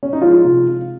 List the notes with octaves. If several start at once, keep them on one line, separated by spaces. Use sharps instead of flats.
C#4
D#4
F3 G#3 F4
C3
F3